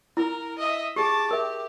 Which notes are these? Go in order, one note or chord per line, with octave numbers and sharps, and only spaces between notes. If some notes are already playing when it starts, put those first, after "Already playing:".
E4 A#4
D#5 E5
G4 G#4 A5 D6
G4 A#4 E5